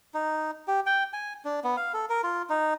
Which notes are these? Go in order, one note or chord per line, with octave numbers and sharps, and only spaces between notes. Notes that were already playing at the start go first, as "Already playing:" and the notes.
D#4
G4
G5
G#5
D4
B3
F5
A4
A#4
F4
D#4